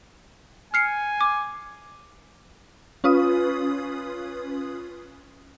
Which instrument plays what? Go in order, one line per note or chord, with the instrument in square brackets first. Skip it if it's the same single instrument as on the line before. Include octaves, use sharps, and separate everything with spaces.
[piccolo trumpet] G#5 [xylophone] F6 C7 C#7
[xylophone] D6
[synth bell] C#4 F4 B4 D#6